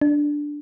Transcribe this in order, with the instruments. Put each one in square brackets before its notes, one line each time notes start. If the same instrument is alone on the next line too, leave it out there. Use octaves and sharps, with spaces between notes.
[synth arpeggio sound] D4